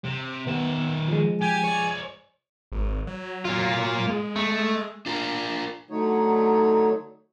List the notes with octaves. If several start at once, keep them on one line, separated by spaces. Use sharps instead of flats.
C3
D#3 B3 E5
F3 G#3
G4 G#5
C#5 D5
G#1
F#3
A#3 F4
G#3
A3
D4 F4 A#4
D3 F#3 A3 D#4 C#5